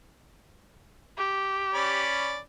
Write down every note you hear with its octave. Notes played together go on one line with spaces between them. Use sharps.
G4
C#4 D5 B5